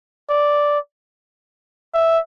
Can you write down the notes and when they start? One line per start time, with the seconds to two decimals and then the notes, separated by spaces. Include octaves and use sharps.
0.29 D5
1.94 E5